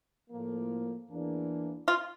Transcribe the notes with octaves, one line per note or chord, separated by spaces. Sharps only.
A2 F3 A#3
E2 E3 A#3 D4
F4